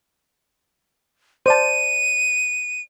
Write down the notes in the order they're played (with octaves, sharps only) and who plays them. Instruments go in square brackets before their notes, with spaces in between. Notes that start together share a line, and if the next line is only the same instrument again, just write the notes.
[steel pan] C5 D5 A5 [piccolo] D#7